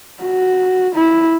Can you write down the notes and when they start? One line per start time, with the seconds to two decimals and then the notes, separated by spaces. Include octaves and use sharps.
0.23 F#4
0.95 E4